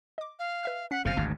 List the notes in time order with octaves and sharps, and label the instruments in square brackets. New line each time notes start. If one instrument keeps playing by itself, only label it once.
[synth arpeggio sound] D#5 D6
[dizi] F5
[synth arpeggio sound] B4 E5 F6
[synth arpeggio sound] C#4 B6 [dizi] F#5
[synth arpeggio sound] G1 A6 [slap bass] F#2 C3 [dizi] F5
[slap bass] G#1 D2 G#2 [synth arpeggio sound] A5